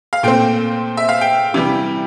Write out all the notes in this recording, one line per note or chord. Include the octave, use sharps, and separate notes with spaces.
F5
A#2 A3 C4 G5
E5
F5
G5
C3 E3 G3